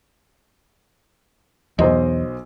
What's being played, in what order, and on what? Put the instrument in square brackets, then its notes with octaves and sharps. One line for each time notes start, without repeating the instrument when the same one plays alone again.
[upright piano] B1 C5 D#5 [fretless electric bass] E2